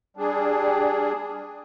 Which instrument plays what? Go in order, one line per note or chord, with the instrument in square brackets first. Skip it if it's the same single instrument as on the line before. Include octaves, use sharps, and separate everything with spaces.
[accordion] G3 D4 G#4